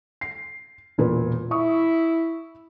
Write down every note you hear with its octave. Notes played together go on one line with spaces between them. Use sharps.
C7
E1 A#2 B4
E4 E5 C#6 D#6